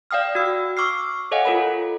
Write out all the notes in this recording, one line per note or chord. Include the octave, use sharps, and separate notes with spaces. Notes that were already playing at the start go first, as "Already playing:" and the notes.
D5 F5 G5 D#6 F6
F#4 E6
C#6 D6 E6 F6 C7
A4 C#5 D#5 F5 F#5 G#5
F4 A4 A#4 C#5 B5